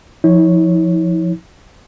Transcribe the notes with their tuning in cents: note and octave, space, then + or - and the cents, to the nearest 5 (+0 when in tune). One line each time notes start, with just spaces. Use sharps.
F3 +0 E4 -45 C#5 +0